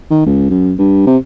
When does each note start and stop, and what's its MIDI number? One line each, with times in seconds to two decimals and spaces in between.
0.11 0.24 51
0.26 0.47 37
0.50 0.73 42
0.78 1.02 43
1.07 1.17 48